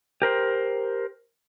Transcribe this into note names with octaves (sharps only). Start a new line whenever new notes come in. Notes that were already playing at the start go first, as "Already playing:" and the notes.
G4 A#4 C5